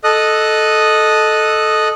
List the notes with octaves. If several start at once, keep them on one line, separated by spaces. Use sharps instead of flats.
A4 D#5 D#6 F#6